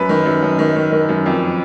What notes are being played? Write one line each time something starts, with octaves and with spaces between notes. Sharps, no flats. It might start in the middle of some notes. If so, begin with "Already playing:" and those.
Already playing: F#2 B4
D#3
F#2
F#2
D#3
D#3
D#3
F#2
F2